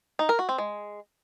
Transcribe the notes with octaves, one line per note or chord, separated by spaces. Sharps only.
D#4
A#4
F#4
C4
G#3